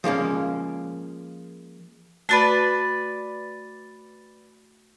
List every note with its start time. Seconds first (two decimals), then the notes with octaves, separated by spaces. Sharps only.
0.04 F3 G#3 A#3 C#4
2.29 A3 F#4 B4 D5 A5